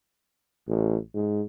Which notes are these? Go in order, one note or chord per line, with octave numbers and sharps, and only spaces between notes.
A1
G#2